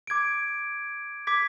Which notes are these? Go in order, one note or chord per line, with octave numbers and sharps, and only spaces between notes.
D6 G#6 D7
D6 G#6 B6